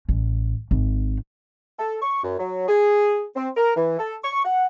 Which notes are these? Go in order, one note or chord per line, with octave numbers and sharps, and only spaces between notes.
A1
G#1
A4
C#6
F#2
F#3
G#4
C4
A#4
E3
A4
C#6
F#5